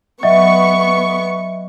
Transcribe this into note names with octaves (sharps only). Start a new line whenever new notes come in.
F#3 B3 D#5 E5 C#6